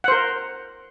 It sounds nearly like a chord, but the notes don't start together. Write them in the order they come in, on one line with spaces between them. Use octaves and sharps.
F#5 C5 A#4